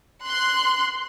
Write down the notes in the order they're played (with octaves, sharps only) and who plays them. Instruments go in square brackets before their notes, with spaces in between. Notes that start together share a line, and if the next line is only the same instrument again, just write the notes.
[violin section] C6 F#6